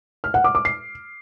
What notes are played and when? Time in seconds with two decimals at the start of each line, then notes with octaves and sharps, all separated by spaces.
0.24 F6
0.34 F#5
0.44 D6
0.55 D6
0.65 C7